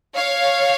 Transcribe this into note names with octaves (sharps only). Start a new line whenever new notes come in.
C#5 F5